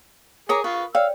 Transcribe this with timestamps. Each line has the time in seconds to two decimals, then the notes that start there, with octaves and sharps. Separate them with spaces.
0.49 G#4 A#4 C#5 A#5 D6
0.64 F4 B4 C#6
0.95 C#5 D5 F5 G5 E6